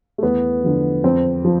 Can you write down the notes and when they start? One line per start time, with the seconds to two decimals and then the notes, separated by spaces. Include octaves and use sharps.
0.18 A3
0.23 E2 B3
0.64 D3 F3
1.04 F2 C4
1.44 F3